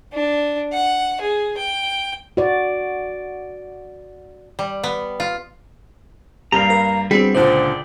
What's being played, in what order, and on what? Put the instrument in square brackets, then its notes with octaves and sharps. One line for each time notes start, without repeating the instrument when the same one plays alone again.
[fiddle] D4
F#5
G#4
G5
[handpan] F#4 D5
[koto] G3
B3
F4
[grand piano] G2 G3 A#3 [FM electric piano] G4 [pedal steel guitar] F5 A#5
[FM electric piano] A#4
[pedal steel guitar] G3 B3 C4 [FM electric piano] D4 F#4 G#4 [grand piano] B6
[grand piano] C#2 A#2 D3 [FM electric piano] C5 A5 [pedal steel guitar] D5 G5